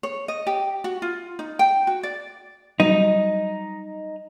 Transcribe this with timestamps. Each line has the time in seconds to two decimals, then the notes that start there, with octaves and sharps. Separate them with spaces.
0.03 C#5
0.28 D#5
0.47 G4
0.84 F#4
1.02 F4
1.39 D#4
1.59 G5
1.87 F#4
2.03 D5
2.80 F#3 G3 D#4